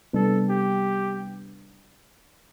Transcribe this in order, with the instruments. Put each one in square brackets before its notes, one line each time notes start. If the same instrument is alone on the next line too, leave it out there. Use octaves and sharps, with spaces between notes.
[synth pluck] C3 G3 B3 D4 [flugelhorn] A4
[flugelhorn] G4